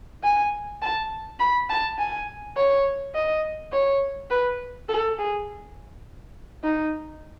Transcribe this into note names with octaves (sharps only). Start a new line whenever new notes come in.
G#5
A5
B5
A5
G#5
C#5
D#5
C#5
B4
A4
G#4
D#4